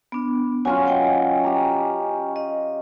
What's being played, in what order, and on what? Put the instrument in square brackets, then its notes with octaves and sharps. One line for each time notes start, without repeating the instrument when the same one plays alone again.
[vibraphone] B3 D4
[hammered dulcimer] F#3 C#4 F4 [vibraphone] G#5
[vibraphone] D#5 G5 G#5
[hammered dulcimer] G4 A#5
[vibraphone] D#5